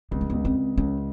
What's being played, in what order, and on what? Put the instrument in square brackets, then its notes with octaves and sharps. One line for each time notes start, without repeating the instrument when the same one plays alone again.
[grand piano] C#2 [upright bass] B3
[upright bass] A#3
[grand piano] C#2 [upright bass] B3
[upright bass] C4
[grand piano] C#2
[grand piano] C#2 [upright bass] C#4